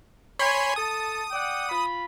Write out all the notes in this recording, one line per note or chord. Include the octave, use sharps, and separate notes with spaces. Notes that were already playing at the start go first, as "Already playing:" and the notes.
C#5 G#5 B5 C6
A4 A5 D#6
D5 F#5 G5
F4 B5